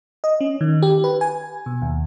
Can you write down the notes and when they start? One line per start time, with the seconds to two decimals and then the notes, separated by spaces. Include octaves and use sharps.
0.24 D#5
0.41 C#4
0.61 D#3
0.83 G4
1.04 B4
1.21 G#5
1.66 B2
1.82 D#2